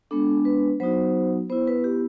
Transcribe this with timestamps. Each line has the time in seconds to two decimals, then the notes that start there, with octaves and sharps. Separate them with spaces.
0.11 G#3 B3 D4 A4
0.45 B4
0.80 F#3 B3 D#4 F#4 C5
1.50 B3 E4 C5
1.67 B4
1.84 G4